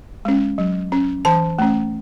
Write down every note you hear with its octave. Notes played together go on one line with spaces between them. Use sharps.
G#3 C#4
F#3
C#4
E3 A5
A3 C#4